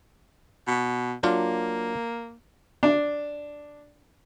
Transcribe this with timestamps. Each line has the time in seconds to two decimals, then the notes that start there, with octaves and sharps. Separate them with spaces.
0.67 B2
1.23 F#3 A#3 D4 F4
2.83 D4